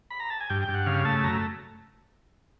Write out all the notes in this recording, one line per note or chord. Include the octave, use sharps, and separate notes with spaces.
B5
A#5
A5
G#5
G2 G5
G5
G2
F#5
C#3 F5
A3 A5
F#2 A#5